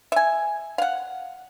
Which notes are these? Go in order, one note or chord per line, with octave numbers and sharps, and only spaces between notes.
E5 G#5
F5 F#5